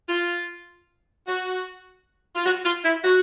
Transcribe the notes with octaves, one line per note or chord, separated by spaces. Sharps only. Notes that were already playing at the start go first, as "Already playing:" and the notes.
F4
F#4
F4
F#4
F4
E4
F#4